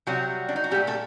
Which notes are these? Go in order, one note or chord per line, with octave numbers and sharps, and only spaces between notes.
C3 F#3 G3 F#4
D4
D#4
F#4
A#2 G3 A3 G4
A3 A4